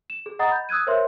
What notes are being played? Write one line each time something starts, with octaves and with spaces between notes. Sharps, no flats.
E7
G#4
D#5 F#5 A#5 D#6 A6
B5 G6
D#6 E6 F#6 G#6 D#7
A#4 C5 C#5 E5 C6